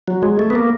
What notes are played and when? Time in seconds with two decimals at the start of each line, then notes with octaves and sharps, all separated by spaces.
0.08 F#3
0.23 G#3
0.39 A3
0.50 B3
0.55 A#3